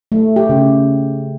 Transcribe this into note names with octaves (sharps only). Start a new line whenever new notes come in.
A3
G4
C#3